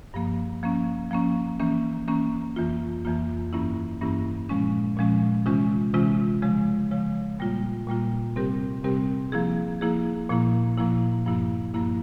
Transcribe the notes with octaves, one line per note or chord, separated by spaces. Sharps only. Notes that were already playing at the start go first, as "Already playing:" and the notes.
G2 F3 A#3
F3 A#3 C#4
F3 A#3 C#4
E3 A#3 C#4
E3 A#3 C#4
F2 E3 A#3 F4
F2 E3 A#3 F4
G2 E3 A#3 C#4 E4
G2 E3 A#3 C#4 E4
A#2 F3 G#3 C#4
A#2 F3 G#3 C#4
C3 E3 G#3 C#4 F4
C3 E3 G#3 C#4 F4
C#3 F3 G#3
C#3 F3 G#3
A#2 G3 A#3 F4
A#2 G3 A#3 F4
C3 G3 C4 G4 A#4
C3 G3 C4 G4 A#4
F3 A#3 E4 G#4
F3 A#3 E4 G#4
A#2 F3 A#3 E4
A#2 F3 A#3 E4
G2 F3 A#3 E4
G2 F3 A#3 E4